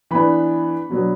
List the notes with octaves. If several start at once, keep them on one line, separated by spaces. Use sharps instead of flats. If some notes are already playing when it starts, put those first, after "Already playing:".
E3 B3 D4 B5
B2 F#3 B3 D4